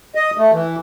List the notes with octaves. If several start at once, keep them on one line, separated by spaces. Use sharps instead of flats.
D#5
A3
E3